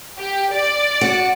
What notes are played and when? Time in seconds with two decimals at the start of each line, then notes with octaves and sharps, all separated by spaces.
0.17 G4
0.53 D5
1.01 F#4